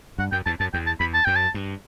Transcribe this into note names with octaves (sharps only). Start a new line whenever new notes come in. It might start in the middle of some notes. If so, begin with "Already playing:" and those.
G2 F#5
F#2 G5
E2 A5
F#2 A5
E2 G5
A5
E2 B5
A5
F#2 G5
A5
G2